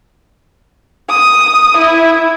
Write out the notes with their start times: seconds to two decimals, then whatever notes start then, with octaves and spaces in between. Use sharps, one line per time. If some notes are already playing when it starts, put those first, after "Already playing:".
1.09 D#6
1.77 E4